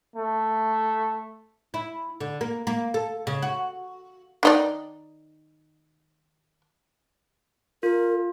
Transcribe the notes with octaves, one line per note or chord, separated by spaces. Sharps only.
A3
E4
D3
A#3
A#3
A4
C#3
F#4
D#3 D#4 D5
F4 A#4